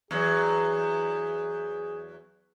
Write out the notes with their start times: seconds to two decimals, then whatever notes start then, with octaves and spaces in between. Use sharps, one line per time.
0.11 E2 F#3 G#4